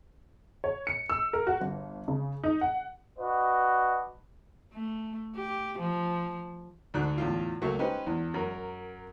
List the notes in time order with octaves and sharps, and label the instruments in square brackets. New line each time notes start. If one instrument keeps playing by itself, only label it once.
[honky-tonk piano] C#5
C#7
E6
A#4
F#4
G1
C#3
D#4
F#5
[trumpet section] D4 F#4 B4 D#5
[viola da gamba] A3
G4
F3
[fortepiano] D2 G#2 D3 F#4 F#6
E2 A2 F4
C#2 F#3 A3 A#3 E5 C#6
C#4 D#4 G4 B4 C5
E2
F#2 A#4